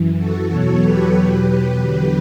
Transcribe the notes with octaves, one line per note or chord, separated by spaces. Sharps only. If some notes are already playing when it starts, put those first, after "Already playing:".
Already playing: F#2 E3
F#4 A4
E2 B2 F#3 A4 C#5
G4 B4
E2 B2 F#3 G4 B4
E2 D3 F#3 G4 B4